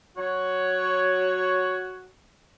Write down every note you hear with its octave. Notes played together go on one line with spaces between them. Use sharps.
F#3 F#4 C#5